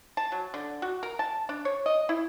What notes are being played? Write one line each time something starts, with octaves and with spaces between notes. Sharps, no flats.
A5
F#3
D3
F#4
A#4
A5
D4
C#5
D#5
E4